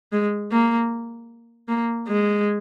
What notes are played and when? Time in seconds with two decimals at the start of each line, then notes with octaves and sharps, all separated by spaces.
0.12 G#3
0.52 A#3
1.69 A#3
2.09 G#3